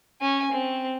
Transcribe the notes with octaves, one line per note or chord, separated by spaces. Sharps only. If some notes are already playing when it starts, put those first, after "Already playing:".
C#4 G#5
C4